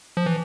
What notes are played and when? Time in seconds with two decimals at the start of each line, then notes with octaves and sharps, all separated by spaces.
0.17 F3
0.26 E3